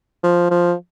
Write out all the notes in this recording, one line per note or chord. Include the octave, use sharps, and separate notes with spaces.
F3
F3